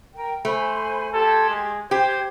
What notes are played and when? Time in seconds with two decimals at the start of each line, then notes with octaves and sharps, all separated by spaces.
0.15 A#4 G5
0.45 A3 C5 G#5 B5
1.14 G4 A4 C6 G#6
1.50 G#3
1.91 G4 C5 G#6